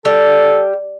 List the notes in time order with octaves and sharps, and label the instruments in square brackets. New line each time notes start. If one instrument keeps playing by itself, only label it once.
[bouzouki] G3 [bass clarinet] A4